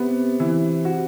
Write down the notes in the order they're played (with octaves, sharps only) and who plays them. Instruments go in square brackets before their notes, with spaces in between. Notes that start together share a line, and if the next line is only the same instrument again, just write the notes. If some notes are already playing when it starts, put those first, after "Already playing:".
Already playing: [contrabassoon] C3 [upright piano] B3
[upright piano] E3
F#4